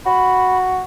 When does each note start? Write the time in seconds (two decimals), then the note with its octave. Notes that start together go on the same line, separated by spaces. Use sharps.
0.06 F#4 B5